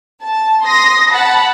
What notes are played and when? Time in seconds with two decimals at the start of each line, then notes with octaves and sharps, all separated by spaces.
0.21 A5
0.64 C6 D#6 A#6
1.10 F#5 A5 B5